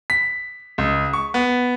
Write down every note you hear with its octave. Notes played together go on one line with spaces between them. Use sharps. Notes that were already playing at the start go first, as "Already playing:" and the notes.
B6
C#2
C#6
B3